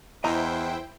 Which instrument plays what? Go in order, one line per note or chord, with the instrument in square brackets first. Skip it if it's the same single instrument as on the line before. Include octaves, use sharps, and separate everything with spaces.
[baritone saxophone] E2 [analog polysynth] E4 C5 G5 [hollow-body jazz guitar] D#5 A#5